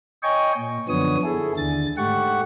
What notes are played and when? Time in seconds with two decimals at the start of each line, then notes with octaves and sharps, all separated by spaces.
0.23 C#5 D#5 G5 G#5 C#6
0.58 A#2
0.88 F#2 D3 F3 B3 C#5 D#6
1.24 E4 G#4 A4
1.57 D#2 D3 A6
1.97 G#2 A3 G4 F#5 C#6